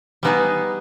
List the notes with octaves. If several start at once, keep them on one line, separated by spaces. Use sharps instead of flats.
G3 B3 D#4 G#4